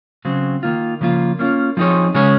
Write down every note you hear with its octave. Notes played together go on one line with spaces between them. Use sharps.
C#3 F#3 C4
D#3 A#3 F4
C#3 F3 A#3 F4
A#3 C#4 F4
F3 C4 D#4 G#4 C#5
C#3 G#3 C#4 G#4 C#5